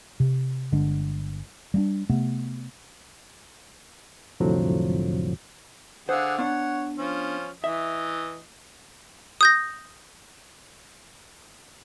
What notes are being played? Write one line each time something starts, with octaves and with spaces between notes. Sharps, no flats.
C3
G1 D3 G#3 D4
G3 A3 D4
C3 A3 B3
C2 F2 A2 D3 F3 F#3
D3 G#4 C5 F5 F#5
B3 D4 C#5 F#5
F3 C#4
E3 D#5 E5
D#6 G6 A#6